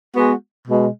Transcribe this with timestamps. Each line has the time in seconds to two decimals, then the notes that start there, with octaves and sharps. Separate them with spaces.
0.14 G#3 B3 F#4
0.68 B2 G#3